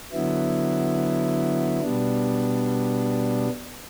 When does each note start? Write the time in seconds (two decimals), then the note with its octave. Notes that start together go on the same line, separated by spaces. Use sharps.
0.12 D3 F#3 B3 E4
1.81 B2 G3 B3 D4